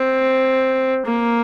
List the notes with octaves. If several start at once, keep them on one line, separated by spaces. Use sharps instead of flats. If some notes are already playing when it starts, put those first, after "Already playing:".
Already playing: C4
A#3